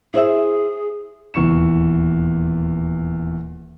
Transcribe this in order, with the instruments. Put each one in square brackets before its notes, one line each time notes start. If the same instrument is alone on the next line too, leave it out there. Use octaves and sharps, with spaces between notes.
[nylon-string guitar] E4 C5 E5 [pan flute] G#4
[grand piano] D#1 E2 E3 C#6 C#7 E7